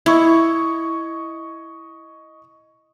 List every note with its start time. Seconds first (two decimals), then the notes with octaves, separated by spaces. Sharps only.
0.06 E4 D#5 C#6 G#6